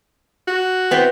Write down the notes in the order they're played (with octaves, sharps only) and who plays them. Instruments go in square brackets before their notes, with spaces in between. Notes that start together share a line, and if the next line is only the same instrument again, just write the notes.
[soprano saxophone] F#4
[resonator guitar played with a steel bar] B3 C4 E4